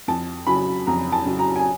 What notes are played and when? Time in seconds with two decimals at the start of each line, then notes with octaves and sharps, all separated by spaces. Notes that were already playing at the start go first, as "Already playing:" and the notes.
0.08 F2 A5
0.47 C#3 F#3 B5
0.87 F2 A#5
1.12 A5
1.26 C#3 F#3
1.39 A#5
1.56 G#5